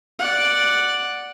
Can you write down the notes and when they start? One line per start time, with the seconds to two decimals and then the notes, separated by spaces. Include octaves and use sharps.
0.19 D5 F#5